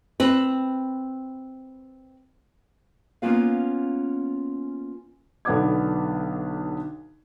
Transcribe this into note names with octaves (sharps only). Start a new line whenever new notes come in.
C4 B4
A#3 B3 C#4 F4 B4 F5
B1 D3 B3 D4 D6 G#6